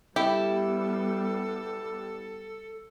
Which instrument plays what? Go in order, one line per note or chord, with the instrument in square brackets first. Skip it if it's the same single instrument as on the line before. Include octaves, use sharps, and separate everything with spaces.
[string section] G3 B3 [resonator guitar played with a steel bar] E4 [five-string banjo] G4 [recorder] A4